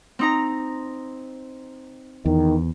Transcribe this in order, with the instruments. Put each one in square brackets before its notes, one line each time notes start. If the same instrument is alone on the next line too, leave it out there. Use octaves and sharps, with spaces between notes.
[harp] C4 D#4 A#5
[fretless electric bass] E2 [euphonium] D#3